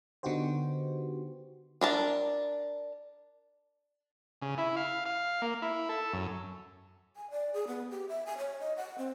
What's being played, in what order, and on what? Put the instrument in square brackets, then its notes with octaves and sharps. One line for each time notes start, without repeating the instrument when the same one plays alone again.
[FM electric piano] D3 B3 D#4 F#4 G4 C5
[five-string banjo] D4 A#4 A5
[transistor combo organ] C#3
E4
F5
F5
A#3
E4
A4
F#2
[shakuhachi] G#5
D5
G#4
B3
G4
E5
G#5
C#5
D#5
F#5
C4